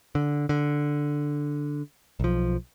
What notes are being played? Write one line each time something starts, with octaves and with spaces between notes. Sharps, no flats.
D3
D3
B1 F3